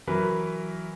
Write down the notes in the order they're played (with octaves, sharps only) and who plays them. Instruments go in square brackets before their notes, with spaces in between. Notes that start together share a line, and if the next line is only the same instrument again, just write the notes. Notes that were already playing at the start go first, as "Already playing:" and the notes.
[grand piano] E3 F#3 A#4 B4 B5